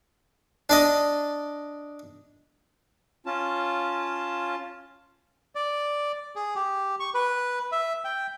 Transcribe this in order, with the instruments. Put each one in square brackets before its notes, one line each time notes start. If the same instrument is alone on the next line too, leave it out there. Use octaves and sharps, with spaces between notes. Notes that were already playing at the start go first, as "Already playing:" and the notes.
[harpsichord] D4 D5 D#5
[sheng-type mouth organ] C#4 F4 A5
[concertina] D5
G#4
G4
C#6
B4
E5
G5